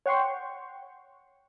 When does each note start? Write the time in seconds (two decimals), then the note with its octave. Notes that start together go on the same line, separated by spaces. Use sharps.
0.06 C#5 F#5 G5 C6 C#6